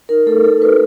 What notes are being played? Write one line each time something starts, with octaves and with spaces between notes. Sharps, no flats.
D#4 A#4
A3 A4
D#4 A4
F#4 B4